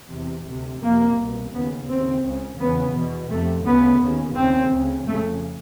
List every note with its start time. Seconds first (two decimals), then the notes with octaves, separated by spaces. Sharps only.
0.12 E2 C3
0.48 D2 C3
0.83 F2 C3 A#3
1.18 C2 B2
1.54 D#2 C#3 B3
1.89 D#2 C#3 C4
2.24 C#2 C#3
2.60 E2 C#3 B3
2.96 E2 B2
3.30 F2 C3 A3
3.66 D2 C#3 B3
4.01 D#2 C#3
4.36 D#2 C#3 C4
4.72 D2 C#3
5.07 F2 C#3 A3